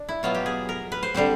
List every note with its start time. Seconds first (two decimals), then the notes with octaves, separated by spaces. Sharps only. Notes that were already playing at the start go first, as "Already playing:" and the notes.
Already playing: D4
0.09 E4
0.23 B2 F#3 B3 F4
0.35 G4
0.46 G#4
0.69 A#4
0.92 B4
1.03 C5
1.14 D3 G3 C4 C5